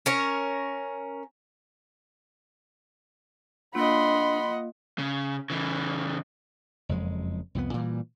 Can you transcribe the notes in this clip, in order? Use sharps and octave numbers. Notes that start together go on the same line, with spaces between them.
C#4 A#4 C#5
A#3 D4 F4 D#5 F#5 B5 C6
C#3
C#3 E3
F#1 F2 G#3
C2 F2 E3 B3
A#2 E3 G3